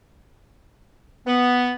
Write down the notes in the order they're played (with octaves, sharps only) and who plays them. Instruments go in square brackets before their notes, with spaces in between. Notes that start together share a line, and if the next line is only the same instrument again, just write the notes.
[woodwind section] B3